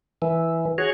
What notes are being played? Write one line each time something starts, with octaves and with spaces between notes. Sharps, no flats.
E3
F#4 G#4 C#5